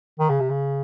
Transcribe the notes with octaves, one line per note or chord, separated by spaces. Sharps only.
D#3
C#3
C3
C#3